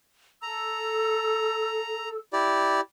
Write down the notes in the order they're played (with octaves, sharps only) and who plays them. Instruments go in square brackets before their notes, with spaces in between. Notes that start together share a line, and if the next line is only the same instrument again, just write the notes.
[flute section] A4 E6 [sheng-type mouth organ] A#5
[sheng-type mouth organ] E4 G4 D5